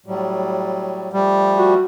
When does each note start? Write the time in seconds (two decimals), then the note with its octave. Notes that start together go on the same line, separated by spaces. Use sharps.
0.06 A2 F#3 G3
1.13 F3 G3 A3
1.59 F#4